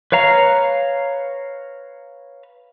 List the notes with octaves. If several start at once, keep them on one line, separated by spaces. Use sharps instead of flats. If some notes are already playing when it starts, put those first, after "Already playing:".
B4 C#5 F5 A#5